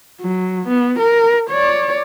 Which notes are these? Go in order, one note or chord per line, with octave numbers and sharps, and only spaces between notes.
F#3
B3
A#4
C#5 D5